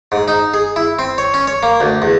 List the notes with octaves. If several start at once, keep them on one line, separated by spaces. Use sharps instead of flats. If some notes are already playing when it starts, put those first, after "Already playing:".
G#2
D#4
G#4
E4
C4
C#5
C#4
C#5
A#3
D2
E2